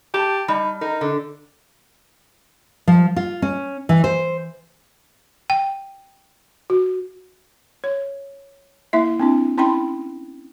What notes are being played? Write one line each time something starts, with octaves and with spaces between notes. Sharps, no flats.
G4 A5
G3 D#4
D#4 A#4
D3
F3
F4
C#4
E3
C5
G5
F#4
C#5
A#3 E4 E5
C4 D4 E4
C#4 E4 G5 B5 C6